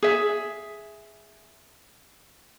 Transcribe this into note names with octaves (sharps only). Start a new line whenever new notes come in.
G#4 E5